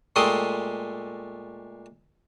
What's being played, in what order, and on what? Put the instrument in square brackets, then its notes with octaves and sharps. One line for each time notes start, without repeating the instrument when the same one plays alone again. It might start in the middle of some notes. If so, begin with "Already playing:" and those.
[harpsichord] A#2 G#3 A3 G4 C6 D#6